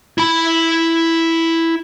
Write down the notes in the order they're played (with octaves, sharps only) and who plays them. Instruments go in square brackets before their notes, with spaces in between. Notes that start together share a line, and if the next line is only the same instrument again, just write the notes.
[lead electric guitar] E4 B5